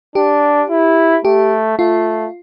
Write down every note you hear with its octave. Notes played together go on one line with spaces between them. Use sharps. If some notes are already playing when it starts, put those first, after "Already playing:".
D4 G4
E4
A3 G4
A3 F4